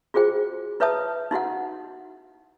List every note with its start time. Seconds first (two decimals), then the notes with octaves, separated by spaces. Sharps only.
0.14 F4 F#4 G#4 C5 G5
0.80 E4 B4 C#5 E5 A5 D#6
1.31 D#4 E4 F#4 F#5